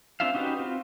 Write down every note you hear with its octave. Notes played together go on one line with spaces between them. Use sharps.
C4 D4 F4 E5 F5
C#4 D#4 F#4 G4 B4
C4 F4